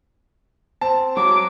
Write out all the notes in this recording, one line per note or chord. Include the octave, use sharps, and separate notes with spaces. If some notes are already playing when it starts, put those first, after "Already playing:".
C4 A5
F#3 F#4 D6